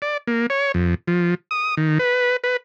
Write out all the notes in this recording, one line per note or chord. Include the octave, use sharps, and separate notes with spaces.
D5
A#3
C#5
F2
F3
D#6
D#3
B4
B4